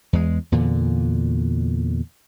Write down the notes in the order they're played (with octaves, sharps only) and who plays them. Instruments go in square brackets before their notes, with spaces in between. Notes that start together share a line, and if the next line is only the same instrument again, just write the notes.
[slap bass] E2 G#3
E2 A#2 D3